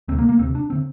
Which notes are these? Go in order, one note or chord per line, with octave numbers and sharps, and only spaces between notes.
D2 C3 C4
A#3
A#3
D2 C3 C4
D4
D3 C4